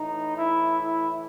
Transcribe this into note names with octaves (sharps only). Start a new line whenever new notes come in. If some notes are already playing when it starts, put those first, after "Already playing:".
Already playing: A2 E3 D#4
E4
E4